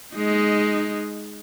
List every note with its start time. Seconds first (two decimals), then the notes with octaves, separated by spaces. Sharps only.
0.15 G#3 D#4